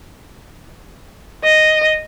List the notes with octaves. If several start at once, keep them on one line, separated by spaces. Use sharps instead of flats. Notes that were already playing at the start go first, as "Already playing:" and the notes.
D#5